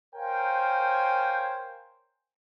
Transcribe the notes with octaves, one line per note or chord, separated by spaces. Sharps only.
A#4 C5 C#5 F5 G5 G#5